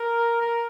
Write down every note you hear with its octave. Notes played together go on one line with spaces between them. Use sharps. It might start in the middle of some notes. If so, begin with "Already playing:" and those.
Already playing: A#4
A#4